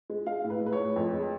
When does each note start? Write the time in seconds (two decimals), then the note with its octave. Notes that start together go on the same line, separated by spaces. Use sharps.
0.10 G#3
0.27 G#3 F5
0.44 A2
0.50 B4
0.61 G#3
0.66 B4
0.73 C#5
0.79 A2
0.96 F2
1.13 G#3